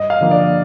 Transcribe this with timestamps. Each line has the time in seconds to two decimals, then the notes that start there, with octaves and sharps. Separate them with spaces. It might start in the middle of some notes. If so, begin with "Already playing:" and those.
Already playing: G2 D#5
0.10 F5
0.21 D3 F3 A#3 D4
0.31 D5